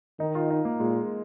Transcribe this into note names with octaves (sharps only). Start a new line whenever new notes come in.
D#3 D#4
F4
D#4
A#3
A#2 G#3